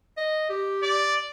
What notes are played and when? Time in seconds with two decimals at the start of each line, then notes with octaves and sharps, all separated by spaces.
0.17 D#5
0.49 G4
0.83 D5